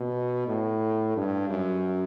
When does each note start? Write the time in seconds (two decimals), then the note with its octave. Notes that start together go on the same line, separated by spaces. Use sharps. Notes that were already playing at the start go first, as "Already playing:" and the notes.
Already playing: B2
0.48 A2
1.16 G2
1.49 F#2